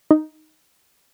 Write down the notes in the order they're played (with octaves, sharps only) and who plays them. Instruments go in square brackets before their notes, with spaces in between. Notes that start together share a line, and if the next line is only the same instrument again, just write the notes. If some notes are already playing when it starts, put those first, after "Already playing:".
[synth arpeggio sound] D#4